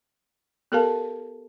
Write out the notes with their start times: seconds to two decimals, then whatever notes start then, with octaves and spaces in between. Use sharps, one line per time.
0.72 B3 G4 A4 A#4 F5 A5